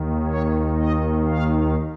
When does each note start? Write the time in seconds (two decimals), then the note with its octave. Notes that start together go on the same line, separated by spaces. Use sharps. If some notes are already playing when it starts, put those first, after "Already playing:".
Already playing: D#2 D#3
0.26 C#5
0.77 D#5
1.28 F5